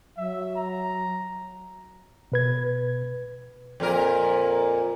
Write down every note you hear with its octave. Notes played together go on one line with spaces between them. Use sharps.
F#3 E5
A#5
B2 B4 G#6
F2 A#2 A#4